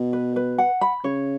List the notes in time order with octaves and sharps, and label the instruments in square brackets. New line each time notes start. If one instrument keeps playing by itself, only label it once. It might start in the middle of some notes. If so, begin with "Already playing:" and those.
Already playing: [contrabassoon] B2
[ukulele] B4
B4
F#5
B5
[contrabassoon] C#3 [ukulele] C#5